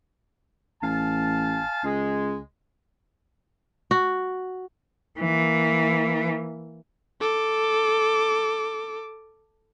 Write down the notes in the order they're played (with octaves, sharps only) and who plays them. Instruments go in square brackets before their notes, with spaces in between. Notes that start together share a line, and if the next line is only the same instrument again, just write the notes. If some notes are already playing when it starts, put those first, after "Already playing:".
[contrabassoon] A1 [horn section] F5 G#5 A5
[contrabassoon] C#2 [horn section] G#3
[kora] F#4
[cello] E3 A#3
[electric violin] A4 D6